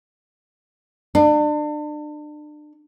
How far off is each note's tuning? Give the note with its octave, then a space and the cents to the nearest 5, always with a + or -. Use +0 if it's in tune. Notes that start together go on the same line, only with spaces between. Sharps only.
D4 +35